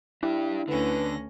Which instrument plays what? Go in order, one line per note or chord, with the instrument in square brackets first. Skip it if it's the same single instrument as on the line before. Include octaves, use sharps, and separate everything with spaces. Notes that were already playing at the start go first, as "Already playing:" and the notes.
[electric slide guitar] D4 G4 [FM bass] E4
[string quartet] D2 C#4 A#6 [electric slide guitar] D3 [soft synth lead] B4